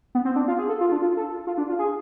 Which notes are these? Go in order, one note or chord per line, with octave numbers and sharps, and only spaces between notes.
B3
C4
D4
F4
G#4
A4
F4
D4
F4
A4
F4
D4
F4
G#4